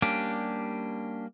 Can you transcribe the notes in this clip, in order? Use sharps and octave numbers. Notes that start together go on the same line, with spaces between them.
G3 A#3 C#4 D4 G4